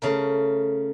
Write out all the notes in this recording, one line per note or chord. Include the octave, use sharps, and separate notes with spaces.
C#3 A3 A#4